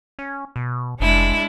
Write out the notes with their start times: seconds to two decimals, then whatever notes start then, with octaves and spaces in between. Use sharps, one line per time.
0.19 C#4
0.56 B2
1.00 F1 G#3 D4 E4